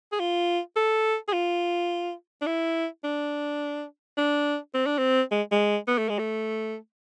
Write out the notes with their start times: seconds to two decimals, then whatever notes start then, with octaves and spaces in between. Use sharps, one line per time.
0.12 G#4
0.20 F4
0.76 A4
1.28 G#4
1.33 F4
2.42 D4
2.47 E4
3.04 D4
4.17 D4
4.74 C4
4.86 D4
4.98 C4
5.32 G#3
5.52 G#3
5.88 B3
5.98 A3
6.09 G#3
6.19 A3